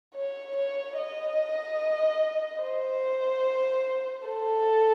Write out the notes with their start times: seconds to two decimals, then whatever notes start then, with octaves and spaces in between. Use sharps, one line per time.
0.15 C#5
0.56 C#5
0.97 D#5
2.62 C5
4.28 A4